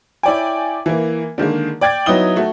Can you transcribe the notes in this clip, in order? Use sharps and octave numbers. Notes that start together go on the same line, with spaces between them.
E4 C#5 D5 G5 G#5
E3 A#3
D3 D#3 G#3 A#3
D5 G5 G#6 A6
F#3 B3 D#4 E4 D#6 G7
A3 F#4